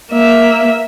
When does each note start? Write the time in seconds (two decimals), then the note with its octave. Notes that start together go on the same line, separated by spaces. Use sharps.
0.12 A#3 E5